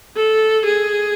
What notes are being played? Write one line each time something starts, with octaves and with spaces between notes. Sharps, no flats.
A4
G#4